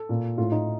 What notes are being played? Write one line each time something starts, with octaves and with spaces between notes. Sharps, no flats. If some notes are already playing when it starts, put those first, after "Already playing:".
Already playing: A4
A#2
A2 F4
D#4